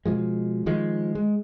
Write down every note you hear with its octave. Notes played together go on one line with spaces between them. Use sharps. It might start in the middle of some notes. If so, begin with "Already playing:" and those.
B2 F3 G#3
D#3 F3 G#3
G#3